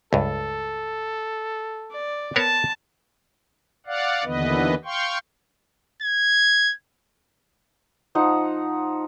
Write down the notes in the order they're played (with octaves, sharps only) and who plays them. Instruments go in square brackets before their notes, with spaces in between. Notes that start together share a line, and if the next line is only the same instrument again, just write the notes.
[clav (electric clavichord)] C#2 G2 [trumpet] A4
[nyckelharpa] D5
[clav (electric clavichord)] B3 A#4 C#5 [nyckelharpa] A5
[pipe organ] D5 F5 F#5
D#2 D3 E3 B3 B4 D#5
F5 G5 C6 C#6
[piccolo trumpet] G#6
[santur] F3 D#4 F#5